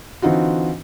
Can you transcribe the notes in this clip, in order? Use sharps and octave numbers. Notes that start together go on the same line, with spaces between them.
D3 E3 C4 D#4 F4 F#4